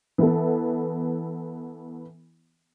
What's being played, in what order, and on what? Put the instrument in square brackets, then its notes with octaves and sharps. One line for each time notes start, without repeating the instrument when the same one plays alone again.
[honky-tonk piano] E3 B3 A4